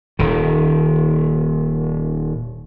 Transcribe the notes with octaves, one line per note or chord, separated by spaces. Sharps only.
D#1 D#3